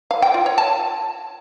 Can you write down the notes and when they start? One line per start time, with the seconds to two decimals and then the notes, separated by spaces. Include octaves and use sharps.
0.11 F5
0.22 G5
0.34 F4
0.46 C#5
0.58 A5